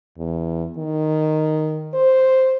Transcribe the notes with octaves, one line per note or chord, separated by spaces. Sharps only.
E2
D#3
C5